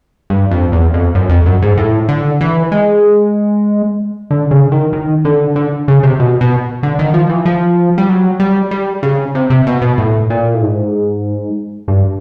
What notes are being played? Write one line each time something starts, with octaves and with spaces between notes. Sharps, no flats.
G2
F2
E2
F2
F#2
F2
F#2
G#2
A2
D3
E3
G#3
D3
C#3
D#3
D#3
D3
D3
C#3
C3
B2
B2
D3
D#3
F3
E3
F3
G3
F#3
G3
G3
C#3
C3
C3
B2
B2
A2
A#2
A2
G#2
G2